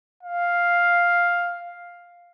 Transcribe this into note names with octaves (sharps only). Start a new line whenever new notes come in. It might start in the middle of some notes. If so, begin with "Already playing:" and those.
F5